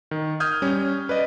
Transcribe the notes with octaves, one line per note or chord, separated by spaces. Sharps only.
D#3
D#6 F6 G6 G#6
G3 C#4
B4 D5 D#5